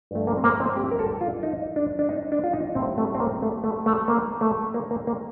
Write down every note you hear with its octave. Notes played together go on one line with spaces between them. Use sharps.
G2 F3 A3
A#3
C4
A#3
C4
G4
A#4
A4
F4
D#4
D4
D4
D#4
D4
F4
D#4
A2 G3 C4
A3
C4
A#3
A3
A3
A3
A#3
A3
A#3
A#3
A#3